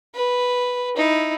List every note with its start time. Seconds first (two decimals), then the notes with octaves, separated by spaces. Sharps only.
0.15 B4
0.96 D#4 E4